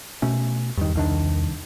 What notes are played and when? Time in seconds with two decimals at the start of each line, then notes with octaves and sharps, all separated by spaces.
0.22 B2 A3 C#4
0.77 E2 G2 D#3
0.95 C2 D#3 D4